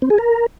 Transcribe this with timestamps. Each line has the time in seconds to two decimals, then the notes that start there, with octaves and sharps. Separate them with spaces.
0.02 C4
0.10 G#4
0.18 A#4